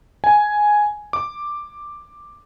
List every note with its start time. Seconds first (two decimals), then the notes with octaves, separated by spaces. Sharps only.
0.24 G#5
1.13 D6